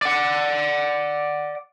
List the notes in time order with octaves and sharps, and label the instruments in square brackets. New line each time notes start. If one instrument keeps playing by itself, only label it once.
[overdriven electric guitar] D5 F#5